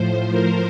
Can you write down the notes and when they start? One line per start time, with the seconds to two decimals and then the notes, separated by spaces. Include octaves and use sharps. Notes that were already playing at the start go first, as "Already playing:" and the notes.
Already playing: A2 F3 C5
0.31 A#4